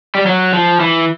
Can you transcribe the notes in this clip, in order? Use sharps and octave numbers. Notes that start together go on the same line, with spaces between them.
G3
F#3
F3
E3